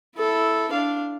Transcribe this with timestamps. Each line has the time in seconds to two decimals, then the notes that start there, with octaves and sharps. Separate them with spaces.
0.17 E4 A4
0.71 D4 F5